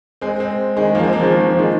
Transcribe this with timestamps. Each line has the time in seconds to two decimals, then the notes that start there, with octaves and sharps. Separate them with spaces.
0.21 G#3 C4
0.40 G#3 C4
0.77 D#3 G#3
0.95 F3 A#3
1.03 G#3 C4
1.13 F3 A#3
1.23 D#3 G#3
1.30 F3
1.40 D#3
1.50 F3
1.59 D#3 G#3